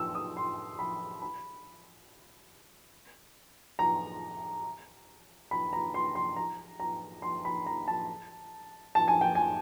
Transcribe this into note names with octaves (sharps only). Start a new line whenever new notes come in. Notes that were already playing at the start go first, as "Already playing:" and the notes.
Already playing: E6
D#6
C6
B5
B5
A#5
B5
A#5
C6
C6
A#5
A#5
C6
B5
A#5
A5
A5
G#5
G5
G#5